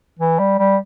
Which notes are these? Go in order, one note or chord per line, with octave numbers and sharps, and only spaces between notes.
E3
G3
G3